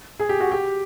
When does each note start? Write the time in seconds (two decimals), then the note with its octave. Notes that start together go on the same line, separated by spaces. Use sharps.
0.19 G#4
0.29 G4
0.40 F#4
0.51 G4